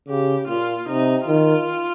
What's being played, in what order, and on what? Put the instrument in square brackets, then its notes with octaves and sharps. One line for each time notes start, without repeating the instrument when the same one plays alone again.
[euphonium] C#3 [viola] G4
[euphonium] A#2 [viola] F4
[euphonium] C3 [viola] D#4
[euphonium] D#3 [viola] F4